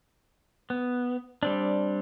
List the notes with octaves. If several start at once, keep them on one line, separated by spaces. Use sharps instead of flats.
B3
G3 C4 D4